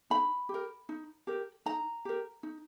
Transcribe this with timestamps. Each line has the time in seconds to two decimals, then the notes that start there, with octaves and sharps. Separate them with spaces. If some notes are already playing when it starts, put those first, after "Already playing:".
0.10 D#4 B5
0.49 G4
0.54 A#4
0.89 D#4
1.27 G4 A#4
1.66 D#4 A#5
2.05 G4 A#4
2.43 D#4